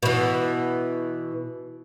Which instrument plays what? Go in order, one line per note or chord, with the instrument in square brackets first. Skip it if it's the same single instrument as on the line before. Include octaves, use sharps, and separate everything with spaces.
[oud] B2 E3